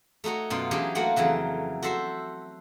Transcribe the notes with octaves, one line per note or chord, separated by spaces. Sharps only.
A3 D#4 F#4 C#5
F#2 B2 F4
E3 F#3 C#4 D4 G4 G#4
A3 A#3 F4 F#4 F#5 G5
F2 C#3 E3 F#3
F#4 A4 C5 E5